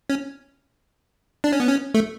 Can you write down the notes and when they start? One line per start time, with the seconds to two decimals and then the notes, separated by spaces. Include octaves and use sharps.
0.10 C#4
1.44 D4
1.52 C#4
1.60 B3
1.68 C#4
1.94 A3